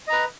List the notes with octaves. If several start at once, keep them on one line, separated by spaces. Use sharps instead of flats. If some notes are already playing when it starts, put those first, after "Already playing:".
B4 D#5 A#5